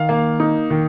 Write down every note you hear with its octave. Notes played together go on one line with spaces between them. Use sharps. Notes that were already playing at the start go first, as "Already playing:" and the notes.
Already playing: D#3 F5
A#3
D#4
D#3